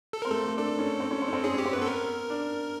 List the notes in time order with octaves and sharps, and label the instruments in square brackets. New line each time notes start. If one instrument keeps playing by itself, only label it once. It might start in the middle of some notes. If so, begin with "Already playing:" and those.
[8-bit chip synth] A4
[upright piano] C4 [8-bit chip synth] A#4
[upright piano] A3 A#3 [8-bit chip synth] A4
[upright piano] A3
[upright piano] D4 [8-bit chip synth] A4
[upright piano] C#4
C4
C#4
C4
C#4
C4
[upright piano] C#4 [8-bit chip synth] G#4
[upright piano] C#4
[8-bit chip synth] G4
[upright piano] C4
[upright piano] B3 [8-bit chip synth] B4
[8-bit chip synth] A4
A#4
[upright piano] D4